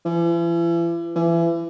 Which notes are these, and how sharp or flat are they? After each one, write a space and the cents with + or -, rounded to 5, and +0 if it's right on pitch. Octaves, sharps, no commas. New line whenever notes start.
E3 +40
E3 +30